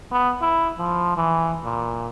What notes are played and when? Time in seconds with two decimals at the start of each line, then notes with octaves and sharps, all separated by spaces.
0.12 B3
0.42 E4
0.78 F3
1.17 E3
1.64 A#2